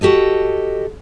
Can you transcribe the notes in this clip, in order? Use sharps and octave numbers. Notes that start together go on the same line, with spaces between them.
F#4 G4 A4 D#5